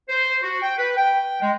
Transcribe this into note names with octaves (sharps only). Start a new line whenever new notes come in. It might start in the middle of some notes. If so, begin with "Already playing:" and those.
C5
F#4
G5
B4
G5
G#3